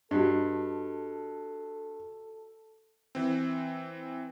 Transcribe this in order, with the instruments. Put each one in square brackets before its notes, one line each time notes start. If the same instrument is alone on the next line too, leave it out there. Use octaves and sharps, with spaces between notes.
[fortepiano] G2 [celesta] F#4 G4 D#5 [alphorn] A4
[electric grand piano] E3 C4